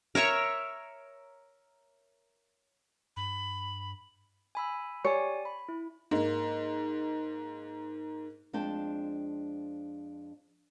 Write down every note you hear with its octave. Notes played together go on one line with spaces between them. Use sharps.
A#4 C#5 E5 C#6
G2 B5
G#5 B5 E6
G4 C#5 D5 G#5
B5
E4
G#2 A#3
F2 G#3 D4 C5 G5 A5